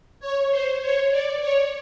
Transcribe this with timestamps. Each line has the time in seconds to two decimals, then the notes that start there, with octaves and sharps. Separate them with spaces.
0.20 C#5
0.51 C5
0.81 C#5
1.11 D5
1.40 C#5